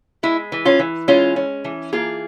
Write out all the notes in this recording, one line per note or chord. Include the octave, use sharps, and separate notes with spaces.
G#3 E4
E3
C#4 F4
E3
G#3 C#4 F4
C#4
E3
A#3 F4 G#4